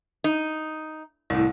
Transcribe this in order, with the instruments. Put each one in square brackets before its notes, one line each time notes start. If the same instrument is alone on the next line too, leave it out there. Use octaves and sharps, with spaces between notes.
[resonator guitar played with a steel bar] D#4
[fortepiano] C2 A2